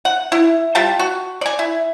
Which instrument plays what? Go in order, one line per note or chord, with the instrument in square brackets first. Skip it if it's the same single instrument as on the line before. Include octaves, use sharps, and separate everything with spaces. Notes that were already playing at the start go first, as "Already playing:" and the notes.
[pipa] F#5
E4
G3 F4 G5 A5
F#4
D5 G#5
E4